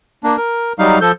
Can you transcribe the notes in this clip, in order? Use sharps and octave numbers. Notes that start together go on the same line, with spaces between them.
A#3 D4
A#4
F#3 G3 D#4 F5
F3 A4 G6